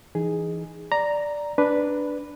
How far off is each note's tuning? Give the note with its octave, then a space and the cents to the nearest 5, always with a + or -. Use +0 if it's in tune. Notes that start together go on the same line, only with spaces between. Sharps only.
E3 +15 D#4 +0 G#4 +0
D5 +0 A#5 +0
D4 +0 B4 +0